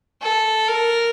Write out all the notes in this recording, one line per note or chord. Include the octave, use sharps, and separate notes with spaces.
A4
A#4